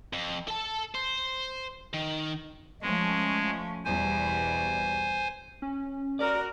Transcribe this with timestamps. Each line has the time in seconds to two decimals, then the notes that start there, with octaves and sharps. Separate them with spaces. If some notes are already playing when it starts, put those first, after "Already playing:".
0.13 F2
0.48 A4 A5
0.95 C5
1.93 D#3
2.82 F3 G#3 A3 C#4
3.85 E2 B2 G3 C5 G#5
5.62 C#4
6.19 F#4 A#4 D5